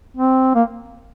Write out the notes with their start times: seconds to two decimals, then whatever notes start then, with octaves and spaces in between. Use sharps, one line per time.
0.17 C4
0.55 A#3